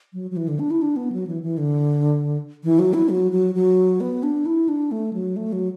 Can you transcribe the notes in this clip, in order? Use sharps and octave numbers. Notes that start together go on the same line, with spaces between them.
F#3
F#3
E3
D3
D4
E4
D4
B3
F#3
E3
E3
D3
E3
F#3
E4
F#3
F#3
F#3
B3
D4
E4
D4
A3
F#3
A3
F#3